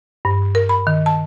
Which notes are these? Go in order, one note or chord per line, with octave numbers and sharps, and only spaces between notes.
G2
A#4
B5
D#3
A5